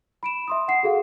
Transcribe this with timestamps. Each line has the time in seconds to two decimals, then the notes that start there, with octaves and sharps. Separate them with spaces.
0.23 B5 D7 E7
0.48 E5 C6 D#6
0.68 F#5 C7
0.83 F#4 G#4 A4 F5 F#5